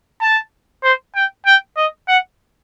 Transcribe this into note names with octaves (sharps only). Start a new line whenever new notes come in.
A5
C5
G5
G5
D#5
F#5